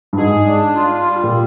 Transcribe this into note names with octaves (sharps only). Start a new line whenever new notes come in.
G2
G#2 G#4
D4
F4
G3
A#2